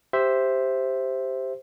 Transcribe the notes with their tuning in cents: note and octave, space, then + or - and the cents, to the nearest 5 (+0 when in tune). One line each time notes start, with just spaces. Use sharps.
G4 +0 C5 +0 E5 +0